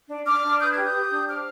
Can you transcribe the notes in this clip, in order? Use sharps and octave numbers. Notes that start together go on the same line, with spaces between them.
D4
D4 D6 F6
D4
B4 D#6 G6
F6 G#6
G4
D#6 G6
G4
D4
C5 D6 F6